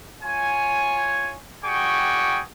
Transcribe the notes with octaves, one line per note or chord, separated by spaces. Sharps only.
F4 C#5 G#5
G3 F#4 G#4 G5 C#6